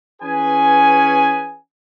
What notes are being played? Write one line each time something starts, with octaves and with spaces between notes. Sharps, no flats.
E3 C#4 G#4 B4 G#5